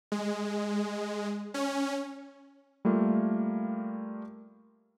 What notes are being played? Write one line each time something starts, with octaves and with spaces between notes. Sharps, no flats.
G#3
C#4
G3 A3 A#3 F4